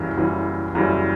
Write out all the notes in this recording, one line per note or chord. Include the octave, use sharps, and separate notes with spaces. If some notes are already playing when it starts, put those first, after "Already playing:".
Already playing: F#1 F#2 E3 G3
F#1 F#2 E3 G3
F#1 F#2 E3 G3